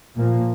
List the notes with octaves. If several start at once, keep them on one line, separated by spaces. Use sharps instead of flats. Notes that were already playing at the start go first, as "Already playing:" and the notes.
A#2 F3 A#3